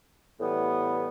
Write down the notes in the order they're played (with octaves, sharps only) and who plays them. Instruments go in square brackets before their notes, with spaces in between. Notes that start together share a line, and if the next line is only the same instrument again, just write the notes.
[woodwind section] A2 E3 G3 B3